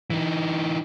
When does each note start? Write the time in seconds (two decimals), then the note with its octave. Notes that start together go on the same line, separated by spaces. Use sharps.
0.10 E3 D#4